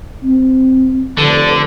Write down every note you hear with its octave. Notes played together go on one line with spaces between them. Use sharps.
C4
F1 D3 A4 B4 D5